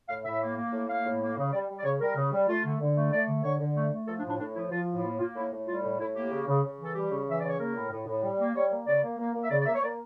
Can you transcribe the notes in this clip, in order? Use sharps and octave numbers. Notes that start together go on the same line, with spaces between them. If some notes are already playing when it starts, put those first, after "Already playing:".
A2 F5
A2 E5
A#3
A#3
A2
A#3 F5
A2
A#3
C#3
G3 D5
G3
D5
C#3 C#5
G3 A#4
C#3
G3
A3 F4
D3
D3
A3
A3 D5
D3
D3 C#5
D3
A3
A3
F3 A4
D4
A2
D4
A2 D4
F3 E4
F3 F4
A2
A#3 F4
A#3 F4
A2 E4
A2
G3 F4
A2
A2 E4
A#3 G4
C#3
C#3
C#3
E3
A4
G3 G4
C#3
E3 E5
C#3 D5
C#5
A#3 A#4
A2
A2
A2
G3
A#3
G3 C#5
A#3
C#3 D5
A#3
A#3
A#3
E5
C#3 D5
D5
A#3 E5
C#5
A#3 D5